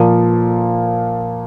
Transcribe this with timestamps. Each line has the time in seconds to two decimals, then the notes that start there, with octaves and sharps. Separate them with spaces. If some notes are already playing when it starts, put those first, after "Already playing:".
Already playing: A#2 F3 A#3 F4